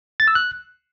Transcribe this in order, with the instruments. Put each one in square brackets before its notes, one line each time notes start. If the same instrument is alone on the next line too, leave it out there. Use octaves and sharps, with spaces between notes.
[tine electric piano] A6
E6
F#6